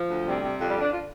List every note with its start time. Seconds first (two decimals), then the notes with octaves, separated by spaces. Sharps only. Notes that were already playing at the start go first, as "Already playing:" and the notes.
Already playing: F3
0.09 D2
0.25 C3 G3
0.42 C3
0.58 F2 G3
0.69 G3
0.75 D3
0.80 D4
0.91 F4